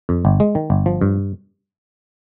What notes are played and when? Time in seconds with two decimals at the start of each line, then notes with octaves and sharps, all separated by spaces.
0.09 F2
0.25 G1
0.40 G#3
0.55 D#3
0.70 G1
0.86 F3
1.01 G2